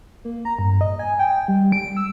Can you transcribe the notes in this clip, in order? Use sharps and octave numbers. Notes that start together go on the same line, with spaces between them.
A#3
A#5
G2
D#5
G#5
G5
G3
D7
E6